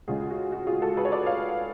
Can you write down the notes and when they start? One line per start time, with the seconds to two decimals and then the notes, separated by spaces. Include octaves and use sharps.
0.07 D2 C#3 G#3 F4 G#4
0.30 F#4
0.52 F#4
0.67 F4 G#4
0.82 F#4 A4
0.97 G#4 B4
1.05 C#5
1.12 B4 D5
1.26 C#5 F5